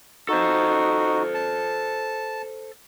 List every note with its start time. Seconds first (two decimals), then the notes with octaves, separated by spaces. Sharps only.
0.29 D#4 F#4 A4 C5
1.34 A5